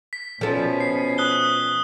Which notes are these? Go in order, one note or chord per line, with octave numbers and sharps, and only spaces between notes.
B6
B2 F3 C#4 A4
C7
D#6 F#6 G7